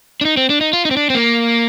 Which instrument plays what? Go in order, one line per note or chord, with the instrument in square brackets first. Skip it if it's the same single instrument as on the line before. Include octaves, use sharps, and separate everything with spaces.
[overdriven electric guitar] D4
D#4
C4
D4
D#4
F4
D#4
C4
D4
C4
A#3